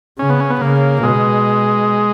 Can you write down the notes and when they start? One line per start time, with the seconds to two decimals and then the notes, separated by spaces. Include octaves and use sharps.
0.19 C#3 C#4
0.29 B3
0.40 C#4
0.50 B3
0.61 C#3 A#3
1.03 B2 G#3